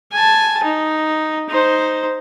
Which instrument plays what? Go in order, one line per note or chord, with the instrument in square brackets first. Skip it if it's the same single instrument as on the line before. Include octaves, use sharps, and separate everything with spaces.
[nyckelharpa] G#5 A5
D#4
D#4 C5